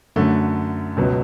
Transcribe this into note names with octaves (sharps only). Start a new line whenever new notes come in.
F#2 D3 F#3 A3
C#2 B2 F#3